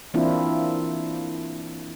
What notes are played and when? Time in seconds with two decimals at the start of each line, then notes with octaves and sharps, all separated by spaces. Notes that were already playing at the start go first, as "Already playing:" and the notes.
0.14 E3 A#3 C4 D4 E4 F4